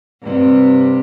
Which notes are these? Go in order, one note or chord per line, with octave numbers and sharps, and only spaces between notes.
G2 C3